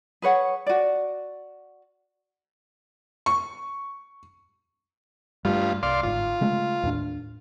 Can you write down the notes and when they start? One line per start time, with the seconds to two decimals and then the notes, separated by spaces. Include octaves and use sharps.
0.22 G#4 B4 C#5 F#5
0.66 F#4 D5
3.26 C#6
5.45 G2 G3 A3 F4
5.83 C2 D5 F5 C6
6.03 G1 G#2 F4
6.41 C#3 G#3 A3
6.83 D#2 A2 D4